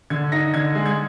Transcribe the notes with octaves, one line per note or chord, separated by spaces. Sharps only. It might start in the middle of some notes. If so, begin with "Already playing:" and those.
D3 G#6
D#4 A#6
D3 G#6
G#3
G#6